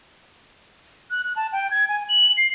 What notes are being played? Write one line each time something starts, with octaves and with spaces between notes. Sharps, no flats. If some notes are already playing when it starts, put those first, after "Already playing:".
F#6
F#6
A5
G5
G#6
G#5
F#7
C7